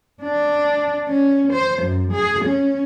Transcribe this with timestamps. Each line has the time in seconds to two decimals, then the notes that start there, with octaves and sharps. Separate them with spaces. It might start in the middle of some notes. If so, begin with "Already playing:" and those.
0.22 D4
1.08 C#4
1.53 C5
1.82 F#2
2.12 G#4
2.45 C#4